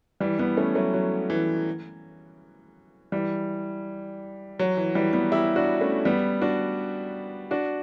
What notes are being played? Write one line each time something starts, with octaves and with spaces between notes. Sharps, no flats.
E3 G3
G3 B3
A3 C#4
F#3 A3
F#3
E3
E3 G3
F#3
E3
E3 G3
G3 B3
E4 G4
D4 F#4
A3 C#4
G3 B3
D4 F#4
D4 F#4